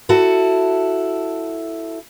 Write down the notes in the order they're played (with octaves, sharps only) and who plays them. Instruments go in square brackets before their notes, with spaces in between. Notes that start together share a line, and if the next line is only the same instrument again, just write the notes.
[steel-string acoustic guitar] E4 F#4 A4